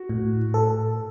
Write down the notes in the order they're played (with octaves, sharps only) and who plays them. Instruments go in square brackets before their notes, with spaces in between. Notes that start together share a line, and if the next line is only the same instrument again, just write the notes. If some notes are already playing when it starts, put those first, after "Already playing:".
Already playing: [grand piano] F#4
[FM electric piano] A2
A4